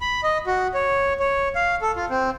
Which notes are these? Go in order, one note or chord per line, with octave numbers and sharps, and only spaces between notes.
B5
D#5
F#4
C#5
C#5
F5
A4
F4
C4